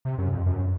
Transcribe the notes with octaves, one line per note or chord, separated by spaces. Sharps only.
C3
F#2
F2
F#2